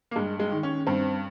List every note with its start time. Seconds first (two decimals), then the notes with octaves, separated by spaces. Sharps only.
0.11 A#3
0.16 G2 G#3
0.40 G#3
0.52 D#3
0.63 C#4
0.87 G2 C4